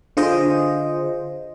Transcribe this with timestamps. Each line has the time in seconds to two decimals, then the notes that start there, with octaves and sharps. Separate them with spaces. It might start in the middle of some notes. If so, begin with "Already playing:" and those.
0.17 D3 F4 G#4 C5 D#5